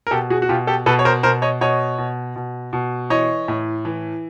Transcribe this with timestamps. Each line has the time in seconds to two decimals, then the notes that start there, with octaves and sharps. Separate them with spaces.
0.07 A#4
0.11 B2 G4 A4
0.30 F#4 G#4
0.42 F#4
0.49 B2 F4 G4
0.67 G4 A4
0.86 B2 A4 B4
0.99 C#5
1.05 A#4 C5
1.23 B2 A#4 C5
1.42 C#5 D#5
1.61 B2 C#5 D#5
1.98 B2
2.36 B2
2.73 B2
3.10 E3 C#5 D#5
3.48 A2
3.85 E3